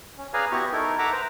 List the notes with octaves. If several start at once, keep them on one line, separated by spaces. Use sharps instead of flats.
C#4
G#4 B4 D5 F5 G#5 A#5
B3 E4 F#4 G4 C#6
D#4 E4 A4 A#4
E5 F#5 A#5 D6
B4 C5 A#5